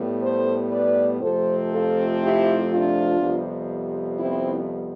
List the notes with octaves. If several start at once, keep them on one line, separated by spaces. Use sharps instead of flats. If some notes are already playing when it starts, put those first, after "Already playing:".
Already playing: A2 G3 B3
A4 C5
B4 D5
F2 C3 F3 A3 C4 A4 C5
F4 A4
E4 G4
D4 F4
F2 C3 G3 B3
C4 E4